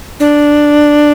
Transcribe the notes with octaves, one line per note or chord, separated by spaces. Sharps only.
D4